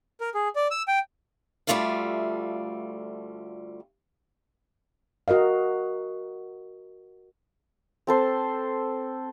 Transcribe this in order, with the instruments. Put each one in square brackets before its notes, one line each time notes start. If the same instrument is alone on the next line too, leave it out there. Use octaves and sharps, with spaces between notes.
[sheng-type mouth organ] A#4
G#4
D5
E6
G5
[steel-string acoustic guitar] D2 G3 A3 F4 E5 F5
[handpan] F#4 A#4 D#5 F5
[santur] C4 A4 C5